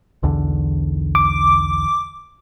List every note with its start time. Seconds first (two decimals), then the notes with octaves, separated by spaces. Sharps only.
0.23 B1 E2 D3
1.15 D6